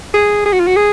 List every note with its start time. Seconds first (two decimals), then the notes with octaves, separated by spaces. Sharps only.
0.14 G#4
0.46 G#4
0.53 F#4
0.60 F4
0.67 F#4
0.76 G#4